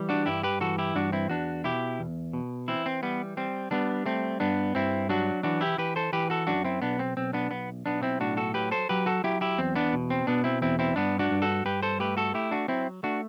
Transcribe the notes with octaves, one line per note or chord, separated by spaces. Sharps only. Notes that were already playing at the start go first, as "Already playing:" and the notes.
Already playing: E3 G3
D4 F#4
G2 E4 G4
G4 B4
E3 F#4 A4
E4 G4
G2 D4 F#4
C4 E4
E2 D4 F#4
B2 E4 G4
E2
B2
E3 C4 E4
C4
G3 B3
G3 C4
G3 B3 D4
A3 C4
G2 B3 D4
G2 C4 E4
F#3 D4 F#4
E3 D4 F#4
E4 G4
E3 G4 B4
A4 C5
E3 G4 B4
F#4 A4
F#2 D4 F#4
C4 E4
B1 B3 D4
C4
B1 C4
B3 D4
B1 B3
B1 B3 D4
C4 E4
A2 D4 F#4
F#4 A4
F#3 G4 B4
A4 C5
F#3 G4 B4
F#4 A4
F#3 E4 G4
E4 G4
E2 C4
B3 D4
B2
C4
B2 B3 D4
C4 E4
E2 C4 E4
C4 E4
G2 B3 D4
D4 F#4
G2
F#4 A4
G2 G4 B4
A4 C5
A3 G4 B4
F#4 A4
A3 E4 G4
D4 F#4
F#3 C4 E4
A3 D4 F#4